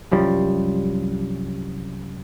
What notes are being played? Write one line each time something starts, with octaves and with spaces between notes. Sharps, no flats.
C2 F#2 F3 G3